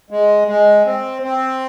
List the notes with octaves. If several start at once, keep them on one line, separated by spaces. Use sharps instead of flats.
G#3
G#3
C4
C4